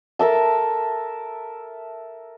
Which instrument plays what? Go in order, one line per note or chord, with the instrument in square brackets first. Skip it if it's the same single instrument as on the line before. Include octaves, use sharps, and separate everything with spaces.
[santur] A4 A#4 E5 A5